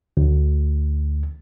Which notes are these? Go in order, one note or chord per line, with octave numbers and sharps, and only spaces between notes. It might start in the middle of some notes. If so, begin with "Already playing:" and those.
D2